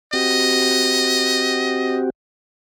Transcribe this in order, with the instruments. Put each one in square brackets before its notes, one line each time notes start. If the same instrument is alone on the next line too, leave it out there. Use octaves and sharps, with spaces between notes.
[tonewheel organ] C4 F#4 G4 [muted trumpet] D#5